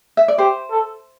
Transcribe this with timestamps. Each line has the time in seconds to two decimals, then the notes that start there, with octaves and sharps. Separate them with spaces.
0.17 E5
0.28 D5
0.38 G4 C5
0.71 A4